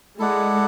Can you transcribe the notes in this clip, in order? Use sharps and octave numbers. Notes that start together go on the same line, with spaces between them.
G#3 E4 A4 D5 F#5